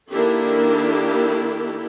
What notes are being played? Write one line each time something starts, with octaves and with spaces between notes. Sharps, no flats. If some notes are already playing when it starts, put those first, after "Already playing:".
D#3 A#3 D4 E4 G4 A4